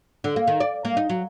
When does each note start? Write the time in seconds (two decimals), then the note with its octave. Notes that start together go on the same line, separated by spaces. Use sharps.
0.24 D3
0.36 A#3
0.47 D#3
0.60 D5
0.85 A#3
0.97 D#4
1.09 F#3